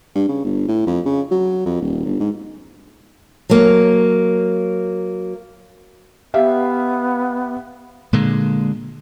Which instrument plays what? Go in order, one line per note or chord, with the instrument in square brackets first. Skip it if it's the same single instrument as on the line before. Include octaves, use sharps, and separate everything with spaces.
[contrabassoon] G2
C#3
G1
A2
F2
C#3
F#3
F2
D#1
G1
G#2
[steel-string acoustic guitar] F#3 A#3
[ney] B3 [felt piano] G4 E5 F5
[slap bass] A#2 D3 G#3